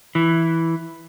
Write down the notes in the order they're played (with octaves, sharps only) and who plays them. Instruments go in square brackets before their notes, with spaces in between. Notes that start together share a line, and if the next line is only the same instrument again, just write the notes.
[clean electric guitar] E3